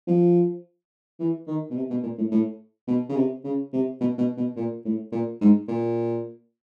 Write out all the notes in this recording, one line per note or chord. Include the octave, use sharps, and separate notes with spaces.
F3
E3
D#3
B2
C3
B2
A#2
A2
A2
B2
C#3
C3
C#3
C3
B2
B2
B2
A#2
A2
A#2
G#2
A#2